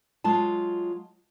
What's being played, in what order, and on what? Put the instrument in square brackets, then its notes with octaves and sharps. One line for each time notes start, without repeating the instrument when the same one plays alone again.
[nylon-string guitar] F#3 G#3 F4 A5